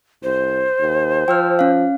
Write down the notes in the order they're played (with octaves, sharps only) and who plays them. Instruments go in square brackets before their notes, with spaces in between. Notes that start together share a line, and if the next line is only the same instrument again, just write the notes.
[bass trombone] C2 [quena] C5
[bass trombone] D#2
[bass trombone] F3 [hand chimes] G5 E6 F6
[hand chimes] C#4 F5